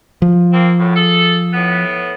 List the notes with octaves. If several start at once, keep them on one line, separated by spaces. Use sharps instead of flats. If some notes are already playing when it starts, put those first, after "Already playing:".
F3
A#3 C4
F#2 A2
G#4 A4
A2 B3